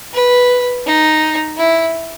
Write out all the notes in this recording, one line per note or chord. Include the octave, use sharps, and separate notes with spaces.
B4
D#4
E4